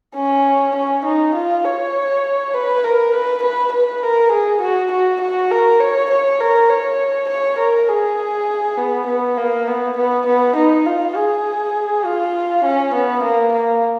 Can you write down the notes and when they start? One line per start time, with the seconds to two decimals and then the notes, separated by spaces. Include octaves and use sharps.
0.16 C#4
0.76 C#4
1.05 D#4
1.35 F4
1.65 C#5
2.54 B4
2.84 A#4
3.14 B4
3.43 B4
3.73 B4
4.03 A#4
4.32 G#4
4.61 F#4
4.92 F#4
5.21 F#4
5.51 A#4
5.80 C#5
6.10 C#5
6.40 A#4
6.70 C#5
7.29 C#5
7.59 A#4
7.89 G#4
8.78 B3
9.07 B3
9.38 A#3
9.68 B3
9.97 B3
10.27 B3
10.56 D#4
10.86 F4
11.16 G#4
12.06 F4
12.65 C#4
12.94 B3
13.23 A#3
13.53 A#3